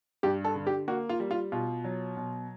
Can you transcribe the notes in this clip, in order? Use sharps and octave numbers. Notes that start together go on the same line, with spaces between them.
G2 G4
A4
D3
G4
A#3 F#4
F4
G3
F4
B2 F4
F#3
B2